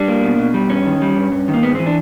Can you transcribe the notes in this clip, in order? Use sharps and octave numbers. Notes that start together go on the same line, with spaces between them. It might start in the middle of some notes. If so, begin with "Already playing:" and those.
Already playing: G3 D4
A#3
B2
B2
G3
G2 C#4
D#3
G3
G2
G2
D#3
A#3
G#2 B3
E3 C4
D4